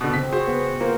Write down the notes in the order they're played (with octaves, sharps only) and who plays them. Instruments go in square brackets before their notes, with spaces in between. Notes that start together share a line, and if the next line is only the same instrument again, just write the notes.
[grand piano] B2 D3
[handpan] C#3 C4 [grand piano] B6
[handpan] F#4 G#4 [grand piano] C5
[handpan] B3 G#4 B4
[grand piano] A#3 [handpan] F4 A#4 C5